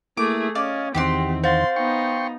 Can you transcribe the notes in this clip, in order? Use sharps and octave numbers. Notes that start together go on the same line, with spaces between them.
A3 A#3 E4 G#4 D6
C#4 D5 D#5 F5
E2 D#3 C4 G4 F#5 C6
F#4 C5 F5 C6 A6
B3 D#4 G5 C6 C#6